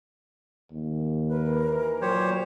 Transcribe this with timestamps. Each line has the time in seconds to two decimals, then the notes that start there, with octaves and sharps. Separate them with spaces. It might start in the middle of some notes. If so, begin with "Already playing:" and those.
0.71 D#2
1.30 A#4 B4
1.65 E3
2.02 A#2 F#3 G4 C5 C#5